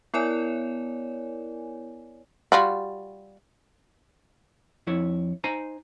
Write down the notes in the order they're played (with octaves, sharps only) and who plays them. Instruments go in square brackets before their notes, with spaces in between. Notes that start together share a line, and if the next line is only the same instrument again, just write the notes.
[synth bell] B3 E4 A#4 C#5 D5 G#5
[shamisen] G3 F4 F#4
[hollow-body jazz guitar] F2 E4 C#5
D#4 C5 G#5 A#5